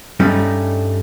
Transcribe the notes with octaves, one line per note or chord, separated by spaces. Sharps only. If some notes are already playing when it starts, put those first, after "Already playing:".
G2 G3 A3 C#4 D#4